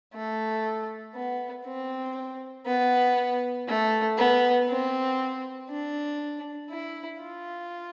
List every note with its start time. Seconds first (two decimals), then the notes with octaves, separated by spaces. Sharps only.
0.14 A3
1.15 B3
1.66 C4
2.66 B3
3.68 A3
4.17 B3
4.69 C4
5.69 D4
6.70 E4
7.22 F4